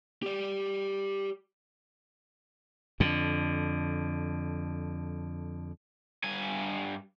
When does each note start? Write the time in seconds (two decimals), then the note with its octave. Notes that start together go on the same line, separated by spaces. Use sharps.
0.23 G4 D5
3.00 F2 D3
6.24 G2 G#5